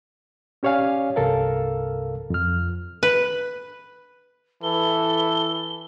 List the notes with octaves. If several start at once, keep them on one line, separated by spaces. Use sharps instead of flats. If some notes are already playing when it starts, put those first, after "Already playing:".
C#4 G4 C#5 D5 F5 G#5
C2 G2 C3 A4 A#4 F5
F2 F6
B4
E3 A4 G7